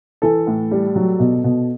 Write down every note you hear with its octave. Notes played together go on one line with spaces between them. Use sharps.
E3 A4
A2
G3
F#3
B2
B2